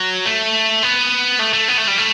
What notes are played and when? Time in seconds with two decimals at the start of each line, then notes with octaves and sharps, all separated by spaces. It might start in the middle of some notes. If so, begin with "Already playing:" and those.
Already playing: F#3
0.25 A3
0.83 B3
1.39 A3
1.53 A3
1.68 B3
1.78 A3
1.88 G3
1.98 A3